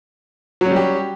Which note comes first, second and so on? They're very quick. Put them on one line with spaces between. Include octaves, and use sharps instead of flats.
F#3 C#4 G3 G4